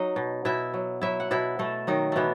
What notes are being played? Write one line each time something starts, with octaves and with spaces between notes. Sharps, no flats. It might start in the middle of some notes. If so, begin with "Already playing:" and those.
Already playing: F#3 D#4 D#5
B2
B2 E4 E5
F#3
F#3 E4 E5
F#5
B2 E4 E5
B2 A3 A4
D#3 F#3 D#4
B2 E3 A3 B3